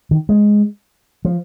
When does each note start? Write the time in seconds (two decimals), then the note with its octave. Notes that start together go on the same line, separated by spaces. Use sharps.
0.11 D#3
0.29 G#3
1.25 F3